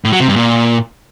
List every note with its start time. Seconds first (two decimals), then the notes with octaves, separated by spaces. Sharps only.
0.05 A2
0.12 F#3
0.20 C3
0.28 G2
0.36 A#2